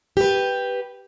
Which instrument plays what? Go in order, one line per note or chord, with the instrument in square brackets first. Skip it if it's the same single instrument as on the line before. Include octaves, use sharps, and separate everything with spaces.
[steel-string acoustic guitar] G4 B4